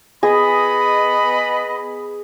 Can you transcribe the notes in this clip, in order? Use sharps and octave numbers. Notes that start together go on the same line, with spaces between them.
B3 G#4 D#5 B5